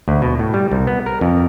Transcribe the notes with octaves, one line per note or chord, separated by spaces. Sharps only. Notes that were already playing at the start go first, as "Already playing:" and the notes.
D2
B2
A2
G3
C2
B3
A#4
F2